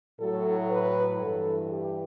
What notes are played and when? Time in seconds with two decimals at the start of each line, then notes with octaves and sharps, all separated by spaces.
0.19 A2 F#3 A4
0.70 B4
1.20 G2 E3 A4
1.71 G4